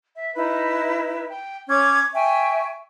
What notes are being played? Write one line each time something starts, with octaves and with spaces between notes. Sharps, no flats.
E5
D#4 E4 B4
G5
C#4 C#5 D6 G#6
E5 G5 G#5 C#6